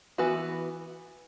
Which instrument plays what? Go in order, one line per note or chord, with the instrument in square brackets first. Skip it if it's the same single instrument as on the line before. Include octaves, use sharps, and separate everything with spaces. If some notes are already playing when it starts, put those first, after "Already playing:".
[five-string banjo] E3 B3 F#4